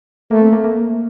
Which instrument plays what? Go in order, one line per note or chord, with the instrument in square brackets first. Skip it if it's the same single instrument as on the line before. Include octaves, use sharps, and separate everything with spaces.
[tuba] A3 [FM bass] A#3
[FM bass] C4
A#3
A#3